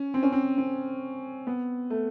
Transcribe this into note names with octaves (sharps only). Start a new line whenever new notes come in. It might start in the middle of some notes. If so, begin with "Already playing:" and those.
Already playing: C#4
C4
C#4
C4
C4
B3
A3